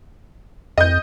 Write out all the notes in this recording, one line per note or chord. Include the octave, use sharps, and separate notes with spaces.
F2 D#5 G6